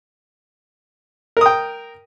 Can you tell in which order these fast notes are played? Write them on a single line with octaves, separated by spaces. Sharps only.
A#4 D#6 G5